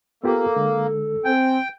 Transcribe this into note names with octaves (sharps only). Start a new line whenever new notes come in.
A#3 B3 F4 G4 A4
D3 G#3
C4 G5 G#5